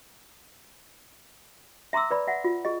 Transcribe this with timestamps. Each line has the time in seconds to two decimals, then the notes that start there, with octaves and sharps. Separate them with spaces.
1.93 E5 A#5 C6 D6 E6
2.11 B4 D5 B5
2.28 E5 F#5
2.44 F4
2.65 G#4 D#5